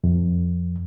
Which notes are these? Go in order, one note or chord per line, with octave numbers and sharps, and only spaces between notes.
F2